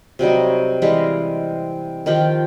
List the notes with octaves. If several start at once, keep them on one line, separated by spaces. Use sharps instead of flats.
C3 F#3 G3 D#4
E3 G3 G#3 F5
D#3 F3 F4 G4